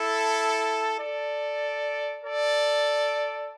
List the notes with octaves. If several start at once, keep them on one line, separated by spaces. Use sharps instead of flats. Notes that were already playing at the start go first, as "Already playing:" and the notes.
Already playing: E4 A4
A4 D5
A4 D5